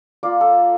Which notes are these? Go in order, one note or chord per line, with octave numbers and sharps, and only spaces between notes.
A#3 F4 D5
A4